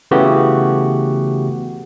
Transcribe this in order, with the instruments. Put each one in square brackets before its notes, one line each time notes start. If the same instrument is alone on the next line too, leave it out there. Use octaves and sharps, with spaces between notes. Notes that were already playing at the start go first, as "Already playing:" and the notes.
[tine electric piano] C#3 E3 A3 B3 F#4 G4